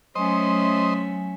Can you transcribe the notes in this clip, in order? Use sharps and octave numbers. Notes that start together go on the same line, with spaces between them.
F#3 A3 C#4 C5 D#5 E5 G#5